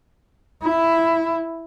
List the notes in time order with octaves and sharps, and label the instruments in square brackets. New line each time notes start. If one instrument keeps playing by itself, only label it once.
[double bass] E4